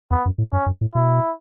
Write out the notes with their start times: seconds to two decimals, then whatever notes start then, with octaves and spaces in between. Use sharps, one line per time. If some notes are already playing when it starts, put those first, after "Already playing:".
0.11 E2 B3
0.26 F#2
0.38 A2
0.53 F#2 C#4
0.66 F#2
0.81 A2
0.95 B2 E4